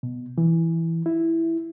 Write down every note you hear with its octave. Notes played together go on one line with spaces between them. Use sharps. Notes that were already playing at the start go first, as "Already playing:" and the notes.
B2
E3
E4